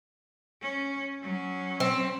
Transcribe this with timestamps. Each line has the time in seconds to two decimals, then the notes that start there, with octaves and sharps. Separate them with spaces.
0.62 C#4
1.22 F#3 C#4
1.80 C4